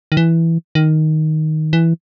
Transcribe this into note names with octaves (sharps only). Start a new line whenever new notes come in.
D#3
E3
D#3
E3